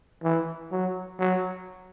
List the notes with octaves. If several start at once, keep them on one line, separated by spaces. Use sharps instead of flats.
E3
F#3
F#3